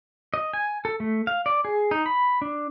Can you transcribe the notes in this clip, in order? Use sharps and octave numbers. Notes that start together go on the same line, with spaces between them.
D#5
G#5
A4
A3
F5
D5
G#4
D#4
B5
D4